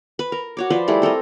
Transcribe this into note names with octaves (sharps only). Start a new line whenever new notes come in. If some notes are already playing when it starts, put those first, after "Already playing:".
B4
A#4
F#4 C#5 D6
F3 B4 C5 D5
G3 A3 E4 G#4
C4 A4 A#4 D#5